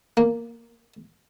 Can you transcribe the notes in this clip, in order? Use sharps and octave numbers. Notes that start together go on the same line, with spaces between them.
A#3